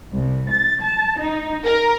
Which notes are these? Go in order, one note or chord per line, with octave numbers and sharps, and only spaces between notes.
C2
A6
A5
D#4
A#4